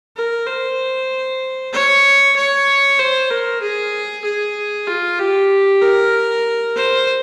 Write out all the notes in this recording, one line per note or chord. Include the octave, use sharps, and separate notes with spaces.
A#4
C5
C#5
C#5
C5
A#4
G#4
G#4
F4
G4
A#4
C5